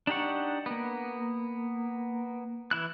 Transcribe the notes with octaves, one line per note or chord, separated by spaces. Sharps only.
D4 D#4 G4 F#5 C#6
A#3 B3
E3 E4 F#6